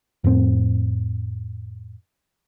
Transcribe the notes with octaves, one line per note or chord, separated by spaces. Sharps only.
F2 A2 C4